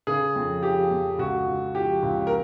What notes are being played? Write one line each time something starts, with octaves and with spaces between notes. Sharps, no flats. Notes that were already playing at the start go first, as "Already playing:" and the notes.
C#3 G#4
F2
F3 G4
F2
C#2 F#4
C#2
F3 G4
C#2
A#4